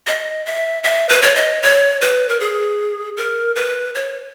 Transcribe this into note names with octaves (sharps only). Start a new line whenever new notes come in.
D#5
E5
E5
B4
C#5
D#5
C#5
B4
A#4
G#4
A#4
B4
C#5